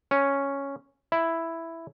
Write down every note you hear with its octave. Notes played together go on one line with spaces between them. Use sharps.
C#4
E4